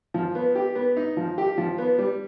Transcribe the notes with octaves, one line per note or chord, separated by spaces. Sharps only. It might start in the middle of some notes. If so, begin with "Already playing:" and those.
F3
B3
G4
B3
D#4
F3
G4
F3
B3
G3